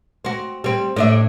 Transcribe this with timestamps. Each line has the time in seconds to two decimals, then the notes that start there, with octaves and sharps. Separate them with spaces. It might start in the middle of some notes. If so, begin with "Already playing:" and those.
0.25 C4 F#4
0.64 G3 C4
0.96 A2 D4 E5